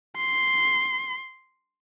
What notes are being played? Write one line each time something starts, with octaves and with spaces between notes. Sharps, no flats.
C6